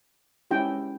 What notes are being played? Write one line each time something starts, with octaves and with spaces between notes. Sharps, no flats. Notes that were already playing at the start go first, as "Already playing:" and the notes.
G#3 C#4 E4 G4 G5